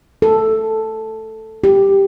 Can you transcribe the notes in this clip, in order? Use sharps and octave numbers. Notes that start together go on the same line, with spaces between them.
A4
G4